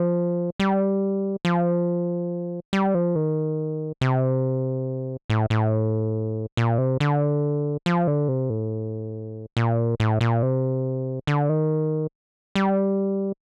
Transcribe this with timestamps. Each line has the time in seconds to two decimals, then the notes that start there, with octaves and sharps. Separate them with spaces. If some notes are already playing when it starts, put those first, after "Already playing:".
Already playing: F3
0.60 G3
1.45 F3
2.73 G3
2.94 F3
3.16 D#3
4.01 C3
5.30 A2
5.50 A2
6.57 A#2
6.78 C3
7.00 D3
7.86 F3
8.07 D3
8.28 C3
8.50 A2
9.57 A#2
10.00 A2
10.21 A#2
10.43 C3
11.27 D3
11.49 D#3
12.55 G3